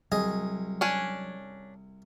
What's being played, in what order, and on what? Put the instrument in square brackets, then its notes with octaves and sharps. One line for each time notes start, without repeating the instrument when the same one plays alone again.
[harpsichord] C2 G#4 D#5 [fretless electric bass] F#3
[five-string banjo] C#4 D4 G#5